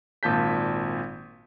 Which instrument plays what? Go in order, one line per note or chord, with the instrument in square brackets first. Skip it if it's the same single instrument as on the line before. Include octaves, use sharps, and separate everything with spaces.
[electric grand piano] G#1 A#2 A5 G6 B6